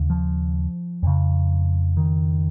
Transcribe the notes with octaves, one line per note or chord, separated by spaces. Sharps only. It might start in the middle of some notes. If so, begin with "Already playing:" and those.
Already playing: D#2 C#3
F3
F2 C#3
D#3